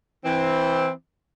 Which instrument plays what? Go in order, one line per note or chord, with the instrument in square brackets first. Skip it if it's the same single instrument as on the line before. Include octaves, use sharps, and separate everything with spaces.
[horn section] E3 C4